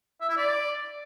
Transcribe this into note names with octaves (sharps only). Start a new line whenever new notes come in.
E5
E4
D5